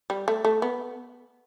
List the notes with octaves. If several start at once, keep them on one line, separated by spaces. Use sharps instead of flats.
G3
A3
A3
B3